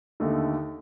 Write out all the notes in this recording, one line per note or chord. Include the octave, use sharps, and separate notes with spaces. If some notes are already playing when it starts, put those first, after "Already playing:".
D#2 D3 A3 D#4 A4